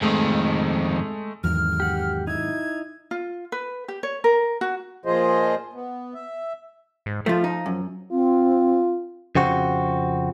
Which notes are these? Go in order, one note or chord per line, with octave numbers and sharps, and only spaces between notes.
F2 D#3 G#3 A3
E2 G#2 D#3 F#3 F6
G4 F#5
D#4 E4 G#6
F4
B4
G4
C#5
A#4
F#4
A#2 F3 F4 G#4 C5 D#5
B3
E5
G#2
F3 A3 F4
D#4
F#2
C4 F4
F2 C#3 C4 F#4